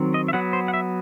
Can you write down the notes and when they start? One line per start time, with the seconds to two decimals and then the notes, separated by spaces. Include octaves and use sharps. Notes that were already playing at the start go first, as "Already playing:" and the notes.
Already playing: D#3 F#3 C4
0.14 D#5
0.28 E5
0.33 F#3 B3 F#5
0.53 C5
0.68 F#5
0.74 E5